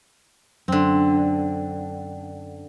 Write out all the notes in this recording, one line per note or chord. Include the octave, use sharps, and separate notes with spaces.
F#2 D3 C4